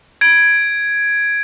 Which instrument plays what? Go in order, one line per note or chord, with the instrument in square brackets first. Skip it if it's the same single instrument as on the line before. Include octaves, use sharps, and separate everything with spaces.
[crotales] G#6 D7